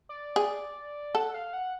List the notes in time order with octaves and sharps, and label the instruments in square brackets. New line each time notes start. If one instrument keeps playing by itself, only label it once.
[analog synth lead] D5
[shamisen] G#4
[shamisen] A4 [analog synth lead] F#5
[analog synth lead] F5
F#5